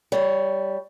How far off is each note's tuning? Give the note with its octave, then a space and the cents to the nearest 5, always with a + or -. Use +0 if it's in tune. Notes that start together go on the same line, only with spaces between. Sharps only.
G3 +0 C#5 +15